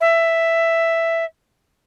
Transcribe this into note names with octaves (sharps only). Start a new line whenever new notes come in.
E5